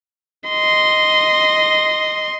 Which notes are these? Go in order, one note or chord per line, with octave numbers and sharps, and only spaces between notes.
D#5 C6